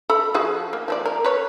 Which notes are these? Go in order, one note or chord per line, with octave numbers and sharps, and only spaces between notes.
A4 B5
F3 F#4 G#4
A#3
F3 A4 D5
A#4
B4 C#5